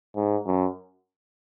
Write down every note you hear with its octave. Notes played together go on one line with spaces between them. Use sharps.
G#2
F#2